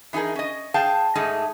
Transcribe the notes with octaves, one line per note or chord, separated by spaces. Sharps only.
E3 D#4 G4 G#4 A#4
C#4 D#5
G#4 F5 G5 A5
G#2 A3 D#4 G#4 D#5